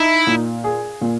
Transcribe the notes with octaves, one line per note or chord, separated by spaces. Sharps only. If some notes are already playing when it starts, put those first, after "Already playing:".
Already playing: D#4 E4
A#2
G#4
A#2